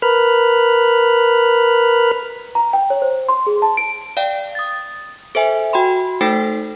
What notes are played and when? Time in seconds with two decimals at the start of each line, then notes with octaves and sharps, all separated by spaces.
0.02 A#4 B4 B5 F6
2.55 A#5
2.73 G5
2.90 C#5
3.02 C5
3.29 C6
3.47 G#4
3.62 A5
3.77 D7
4.17 D5 F5 G5
4.55 D#6 A6
5.35 A4 C5 E5 G#5
5.73 F#4 G5 B5 C6
6.21 A3 D#4 A4 C5 G5 C7